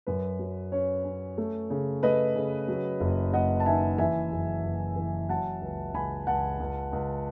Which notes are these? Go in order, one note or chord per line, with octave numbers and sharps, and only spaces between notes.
F#2 B4
F#3
C#4 C#5
C#4
A3
C#3
A3 B4 D#5
C#3
F#3
F#1
F#1 D#5 F#5
A5
D#3 E5 G#5
E3 E5 G#5
F#1
F#1
E3
F#3 F#5 A5
C#2
C#2 G#5 B5
C#2 F#5 A5
C#2
C#2